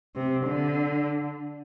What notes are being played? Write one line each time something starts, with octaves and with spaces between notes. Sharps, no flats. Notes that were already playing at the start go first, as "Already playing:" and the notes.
C3
D3